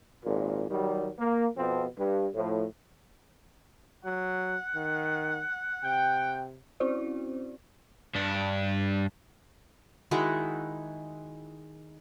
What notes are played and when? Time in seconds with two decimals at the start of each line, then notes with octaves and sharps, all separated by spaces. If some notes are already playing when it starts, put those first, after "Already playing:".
0.24 G#1 A#2
0.69 D#3 F#3 G3
1.18 A#3
1.57 F2 B2 F3 C4
1.97 G2
2.34 A2 F3
4.05 F#3 F#5
4.75 D#3
5.84 C3 G5
6.80 C4 C#4 E4 F#4 C5 D5
8.15 G2 D4
10.11 D#3 G#3 E4 F#4